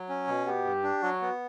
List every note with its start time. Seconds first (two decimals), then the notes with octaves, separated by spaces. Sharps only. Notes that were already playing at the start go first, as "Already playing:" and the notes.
Already playing: F#3
0.09 C#4
0.27 B2
0.46 B3 G4
0.65 G2
0.84 D4
1.03 F#3 F#4
1.21 B3